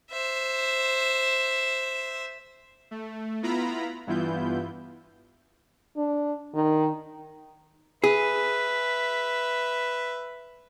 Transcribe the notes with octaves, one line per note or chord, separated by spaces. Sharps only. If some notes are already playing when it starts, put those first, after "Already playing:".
C5 E5
A3
B3 E4 F4 A#5 B5
G2 E3 B3 E4 F4 G6
D4
D#3
G#4 B4 E5